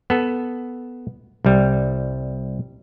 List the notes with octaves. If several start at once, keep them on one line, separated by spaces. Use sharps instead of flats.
B3 A4
C2 G3